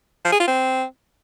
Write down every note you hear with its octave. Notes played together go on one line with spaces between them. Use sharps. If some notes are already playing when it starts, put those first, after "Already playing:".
F3
G#4
F4
C4